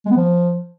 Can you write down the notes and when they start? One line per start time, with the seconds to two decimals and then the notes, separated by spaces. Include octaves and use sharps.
0.05 G#3
0.11 B3
0.16 F3